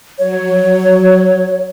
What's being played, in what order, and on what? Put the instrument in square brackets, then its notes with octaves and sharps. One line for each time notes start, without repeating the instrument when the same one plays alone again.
[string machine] F#3 [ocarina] C#5